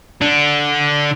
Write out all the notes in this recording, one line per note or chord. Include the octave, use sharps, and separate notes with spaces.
D3 D4